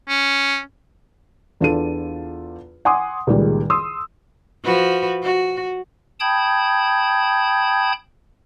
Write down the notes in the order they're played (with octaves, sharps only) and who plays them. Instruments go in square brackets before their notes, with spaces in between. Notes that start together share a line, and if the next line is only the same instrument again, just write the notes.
[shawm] C#4
[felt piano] E2 D4 F4 A4 D#7
F#5 G#5 C6 D6 D#6
C#2 A#2 D#3 G3 G#3
C6 D#6 E6
[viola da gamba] F3 F#4 B4
F#4
[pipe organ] G5 A5 B5 D#6 G6 G#6